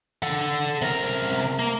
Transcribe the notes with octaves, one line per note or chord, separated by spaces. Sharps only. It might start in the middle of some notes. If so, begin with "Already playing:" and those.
A4 F#5
C3 A#4
A#3